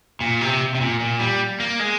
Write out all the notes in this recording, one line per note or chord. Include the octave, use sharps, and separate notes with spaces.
A#2
C3
C3
A#2
A#2
G3
A#3
G#3